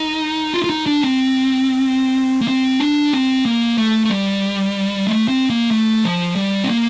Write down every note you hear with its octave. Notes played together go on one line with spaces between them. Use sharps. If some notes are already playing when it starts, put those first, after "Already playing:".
Already playing: D#4
F4
F4
D#4
D4
C4
A#3
C4
D4
C4
A#3
A3
A3
G3
A3
C4
A#3
A3
F3
G3
C4
A#3